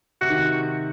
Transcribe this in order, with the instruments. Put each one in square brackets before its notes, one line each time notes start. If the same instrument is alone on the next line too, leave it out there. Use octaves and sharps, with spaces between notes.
[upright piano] C3 [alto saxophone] F#4
[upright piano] D#3
C3